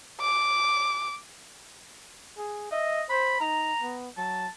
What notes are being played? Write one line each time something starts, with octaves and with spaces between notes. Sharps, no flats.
D6
G#4
D#5 E5
C5 B5
D#4 A#5
B3
F#3 A5